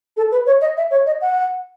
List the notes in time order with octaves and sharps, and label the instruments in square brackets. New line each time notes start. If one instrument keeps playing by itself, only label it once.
[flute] A4
B4
C#5
D#5
E5
C#5
D#5
F#5